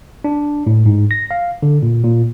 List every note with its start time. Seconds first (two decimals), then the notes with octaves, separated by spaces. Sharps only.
0.24 D4
0.67 A2
0.86 G#2
1.11 A#6
1.31 F5
1.63 D3
1.83 A#2
2.04 A#2